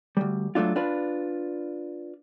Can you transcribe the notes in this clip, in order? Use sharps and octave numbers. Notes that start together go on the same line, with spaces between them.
D2 G3
F#3 A3 D4 F4
D4 F4 B4